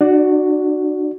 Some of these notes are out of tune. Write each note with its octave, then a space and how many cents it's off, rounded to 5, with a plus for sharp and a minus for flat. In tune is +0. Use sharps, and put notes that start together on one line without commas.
D4 +45 F#4 +0 D5 +0